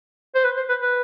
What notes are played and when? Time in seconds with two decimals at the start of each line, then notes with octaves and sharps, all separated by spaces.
0.35 C5
0.44 B4
0.57 C5
0.69 B4
0.81 B4